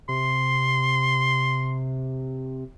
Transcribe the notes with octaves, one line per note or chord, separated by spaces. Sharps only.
C3 C6